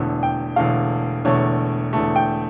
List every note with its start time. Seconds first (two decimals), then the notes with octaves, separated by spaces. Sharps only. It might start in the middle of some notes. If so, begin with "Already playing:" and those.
Already playing: E1 E2 D3 A3
0.23 G5
0.56 E1 E2 D3 A3 F5
1.25 E1 E2 D3 A3 C#5
1.93 E1 E2 D3 A3
2.16 G5